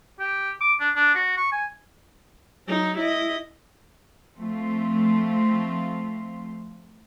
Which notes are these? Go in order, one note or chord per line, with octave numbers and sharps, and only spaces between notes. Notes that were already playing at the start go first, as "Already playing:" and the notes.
G4
D6
D4
D4
F#4
C#6
G#5
F#3 D#4
E4 D#5
F3 A3 C4 F4